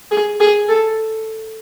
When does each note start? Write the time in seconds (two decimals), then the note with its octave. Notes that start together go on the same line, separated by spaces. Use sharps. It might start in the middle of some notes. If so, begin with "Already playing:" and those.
0.11 G#4
0.40 G#4
0.69 A4